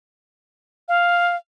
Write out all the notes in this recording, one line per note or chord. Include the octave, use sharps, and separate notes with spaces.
F5